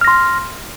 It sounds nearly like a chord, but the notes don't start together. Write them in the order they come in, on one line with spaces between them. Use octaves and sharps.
F6 A#6 C6